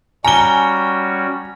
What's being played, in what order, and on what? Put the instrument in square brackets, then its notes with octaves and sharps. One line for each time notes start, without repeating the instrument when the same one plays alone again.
[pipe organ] G3 C#4 F#4 [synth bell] G#5 [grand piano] A#5 G7